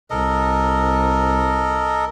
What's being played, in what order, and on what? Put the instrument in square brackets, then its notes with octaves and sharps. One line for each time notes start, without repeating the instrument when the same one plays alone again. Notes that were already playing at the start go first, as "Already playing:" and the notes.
[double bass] C2 [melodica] A4 A#4 D#5